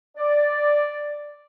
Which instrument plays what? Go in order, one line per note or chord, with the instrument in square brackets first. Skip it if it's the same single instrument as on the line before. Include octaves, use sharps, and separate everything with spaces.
[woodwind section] D5